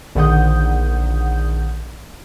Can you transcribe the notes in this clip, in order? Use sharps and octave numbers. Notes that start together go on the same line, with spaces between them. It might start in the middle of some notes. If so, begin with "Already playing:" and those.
A#1 D3 D#3 F#5 D#6 G6